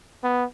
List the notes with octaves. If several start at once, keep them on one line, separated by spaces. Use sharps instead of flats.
B3